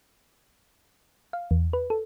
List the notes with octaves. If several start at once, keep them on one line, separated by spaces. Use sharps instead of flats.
F5
E2
B4
A4